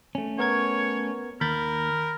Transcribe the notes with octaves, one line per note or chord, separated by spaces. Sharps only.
A3 C#4
B3 A#4 C#5 G#6
D#2 A#4 B5 G6 A6